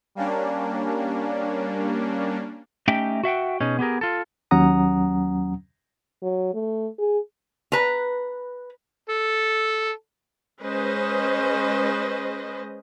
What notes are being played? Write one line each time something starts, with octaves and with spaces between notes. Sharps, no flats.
G3 A#3 C#4 D4
A3 C#4 D#4 G4 E5 G5
F#4 E5 F#5 G5
B2 C#4 D#4 G#4
B3 G4 G#4 A#4
F4 A4
D#2 F#3 C#4 F#5 A#5 D#6
F#3
A3
G#4
B4 A#5
A4
G#3 C#4 B4 C5 D#5